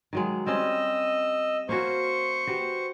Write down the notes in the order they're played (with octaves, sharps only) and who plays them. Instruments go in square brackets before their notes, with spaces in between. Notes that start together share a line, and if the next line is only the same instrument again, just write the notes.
[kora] D#3 F#3 G#3
[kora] G3 C4 C#4 [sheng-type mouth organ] D#5 E6
[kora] A#3 C#4 F#4 [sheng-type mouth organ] C5 C#6
[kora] F#4 G4 B4